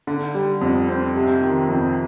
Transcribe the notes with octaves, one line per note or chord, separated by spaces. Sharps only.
D3
G3
F2
C4
C3
D#3
F2